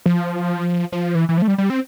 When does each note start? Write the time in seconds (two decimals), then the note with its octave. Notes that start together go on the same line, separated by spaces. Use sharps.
0.06 F3
0.92 F3
1.15 E3
1.29 E3
1.37 F3
1.42 A3
1.48 G3
1.58 G3
1.70 C4